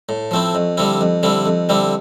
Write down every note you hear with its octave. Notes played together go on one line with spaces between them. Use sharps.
A2
F3 A3 C4 E4
F2
D3 G3 C4 E4
F2
D3 G3 C4 E4
F2
D3 G3 C4 E4